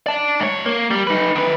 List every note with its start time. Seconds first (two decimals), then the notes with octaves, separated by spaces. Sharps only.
0.06 D5 A5
0.40 G#2 C#5
0.66 A#3
0.91 G3
1.07 D#4 B4
1.36 D#3 B4